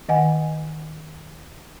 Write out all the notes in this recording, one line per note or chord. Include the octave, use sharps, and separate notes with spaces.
D#3 D#5 F#5 G#5